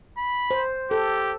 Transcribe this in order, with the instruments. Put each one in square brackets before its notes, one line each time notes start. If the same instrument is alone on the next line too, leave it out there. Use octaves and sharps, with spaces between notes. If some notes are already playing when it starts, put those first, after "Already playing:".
[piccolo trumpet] B5
[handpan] C5
[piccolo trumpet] G4 [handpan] A4